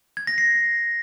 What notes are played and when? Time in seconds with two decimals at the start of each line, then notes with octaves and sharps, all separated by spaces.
0.17 G#6
0.27 A#6
0.38 C7